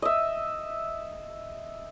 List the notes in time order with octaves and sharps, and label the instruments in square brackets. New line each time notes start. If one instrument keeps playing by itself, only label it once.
[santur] D#5 E5